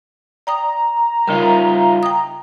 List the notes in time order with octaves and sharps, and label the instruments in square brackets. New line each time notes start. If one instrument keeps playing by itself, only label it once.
[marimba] D5 G5 D#6 [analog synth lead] A#5
[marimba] C#3 A#4 [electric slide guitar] G3 D#4 F4
[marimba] G5 D#6